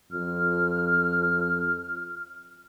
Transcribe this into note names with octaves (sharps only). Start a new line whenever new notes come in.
F2 F6